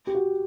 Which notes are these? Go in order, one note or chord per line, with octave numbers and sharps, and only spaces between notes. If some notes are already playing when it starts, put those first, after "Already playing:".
G4
F#4